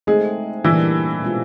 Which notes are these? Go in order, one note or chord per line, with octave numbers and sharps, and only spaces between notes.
G#3 A3 C4 D#4 G#4
A#2 E3 G3 A#3 D4 E4
B2 G#3 C4 F4